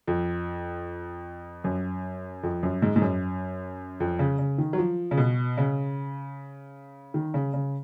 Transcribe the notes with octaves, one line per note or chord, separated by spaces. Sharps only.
F2
F#2
F2
F#2
G#2
G#2
F#2
F2
C#3
C#3
D#3
F#3
F3
C#3
B2
C#3
D#3
C#3
C#3